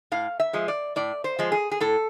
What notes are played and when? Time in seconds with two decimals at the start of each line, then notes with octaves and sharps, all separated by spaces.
0.12 A2 F5
0.40 E5
0.53 F3 G#3
0.68 D5
0.96 A2 D5
1.24 C5
1.39 F3 G#3
1.52 G#4
1.71 G#4
1.81 A2 A4